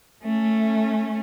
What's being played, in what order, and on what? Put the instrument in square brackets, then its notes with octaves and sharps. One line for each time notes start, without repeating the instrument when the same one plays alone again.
[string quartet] A3 C#4